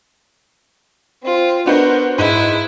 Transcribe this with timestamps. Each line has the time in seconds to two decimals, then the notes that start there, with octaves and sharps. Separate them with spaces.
1.23 C4 F4
1.66 B3 D4 F#4 A#4 C5
2.18 G#2 E4 D#7